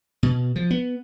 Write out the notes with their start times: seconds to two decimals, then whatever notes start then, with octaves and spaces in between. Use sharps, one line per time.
0.23 B2
0.56 F3
0.71 B3